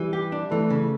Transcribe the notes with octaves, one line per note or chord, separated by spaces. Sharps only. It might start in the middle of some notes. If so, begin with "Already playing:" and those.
Already playing: E3 G3
G4
D4
E3 A3
C#3